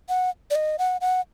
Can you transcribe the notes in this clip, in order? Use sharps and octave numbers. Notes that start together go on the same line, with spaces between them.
F#5
D5
D#5
F#5
F#5